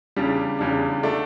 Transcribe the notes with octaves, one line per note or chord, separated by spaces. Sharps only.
E2 C#3 G3 D4
E2 C#3 G3 D4
D3 A3 D4